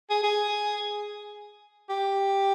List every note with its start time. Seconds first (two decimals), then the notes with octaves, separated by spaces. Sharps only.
0.10 G#4
0.23 G#4
1.89 G4